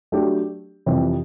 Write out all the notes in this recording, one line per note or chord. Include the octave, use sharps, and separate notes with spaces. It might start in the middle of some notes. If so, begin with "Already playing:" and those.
F#3 A3 D4 G4
F2 C3 E3 G3